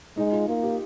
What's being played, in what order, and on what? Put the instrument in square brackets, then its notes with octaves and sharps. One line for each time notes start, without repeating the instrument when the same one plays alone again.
[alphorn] G#3 [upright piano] D#4
[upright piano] F4
[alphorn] A#3 [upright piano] F4
[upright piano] G4